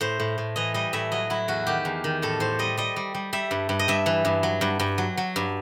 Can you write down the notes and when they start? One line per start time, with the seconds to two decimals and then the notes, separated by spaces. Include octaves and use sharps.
0.01 A2 C5
0.20 A2
0.38 A2
0.56 E3 D#5
0.74 G3 D#5
0.93 A2 E5
1.12 F#3 D#5
1.30 F#3 E4
1.48 E2 F#4
1.67 D#3 G4
1.85 E2
2.04 D#3
2.22 A2 A4
2.40 A2 C5
2.59 G3 D#5
2.77 G3 D#5
2.96 G3
3.14 G3
3.33 G3 E5
3.51 G2
3.69 G2
3.79 D#5
3.88 G2 E5
4.06 E3
4.25 G2
4.43 F#3
4.61 G2
4.80 G2
4.98 F#3
5.17 F#3
5.36 G2